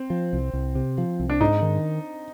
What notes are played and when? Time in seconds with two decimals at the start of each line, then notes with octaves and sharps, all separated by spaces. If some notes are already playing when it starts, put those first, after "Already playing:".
Already playing: C4
0.10 F3
0.33 C2
0.53 C2
0.75 C3
0.98 F3
1.20 C2
1.29 D4
1.41 G#2 D#4
1.62 D#3